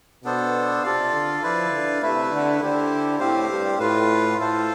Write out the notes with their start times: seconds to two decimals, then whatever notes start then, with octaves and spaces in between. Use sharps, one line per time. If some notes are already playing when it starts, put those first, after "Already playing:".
0.24 B2 B3 D4 A4 C5
0.83 C3 F4 A4 D5 F5
1.13 D3
1.42 F3 E4 B4 D5 F5
1.72 D3
2.02 C3 A3 E4 B4 E5
2.31 D3
2.60 D3 E4 G4 C5
3.19 A2 C4 G4 C5 F5
3.49 G2
3.79 A2 F4 B4 F5
4.38 A2 F4 A4 C5 F5